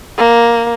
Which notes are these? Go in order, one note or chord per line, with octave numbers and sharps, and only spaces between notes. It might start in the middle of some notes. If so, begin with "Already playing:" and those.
A#3